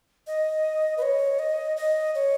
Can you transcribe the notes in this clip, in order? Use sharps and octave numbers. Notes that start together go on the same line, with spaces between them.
D#5
B4
C#5
D#5
D#5
C#5